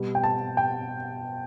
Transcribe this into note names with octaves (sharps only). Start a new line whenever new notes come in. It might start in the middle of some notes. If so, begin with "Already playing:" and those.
Already playing: B2 G3
G5
A5
G5